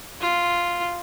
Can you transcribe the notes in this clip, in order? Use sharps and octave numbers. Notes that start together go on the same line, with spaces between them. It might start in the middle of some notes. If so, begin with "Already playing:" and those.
F4